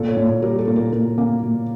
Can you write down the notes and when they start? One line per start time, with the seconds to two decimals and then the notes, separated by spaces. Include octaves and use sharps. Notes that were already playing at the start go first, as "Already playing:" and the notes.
Already playing: A#2 A4
0.09 C#5
0.17 A#2
0.42 G3 A#4
0.58 A4
0.68 A#2
0.76 A#4
0.92 A#2 A#4
1.18 A#3
1.43 A#2